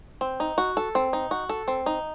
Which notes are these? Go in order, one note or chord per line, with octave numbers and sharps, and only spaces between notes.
C4
D#4
F#4
A4
C4
D#4
F#4
A4
C4
D#4